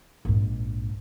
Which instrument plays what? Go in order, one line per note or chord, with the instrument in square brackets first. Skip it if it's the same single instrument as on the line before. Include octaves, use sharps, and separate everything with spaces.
[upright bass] A#1 G#2